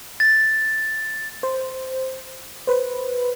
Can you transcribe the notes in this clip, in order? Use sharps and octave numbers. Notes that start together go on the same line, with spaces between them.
A6
C5
B4 C5